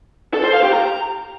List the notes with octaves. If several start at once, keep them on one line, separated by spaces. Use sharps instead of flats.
A4
C5
F5
G4
A#5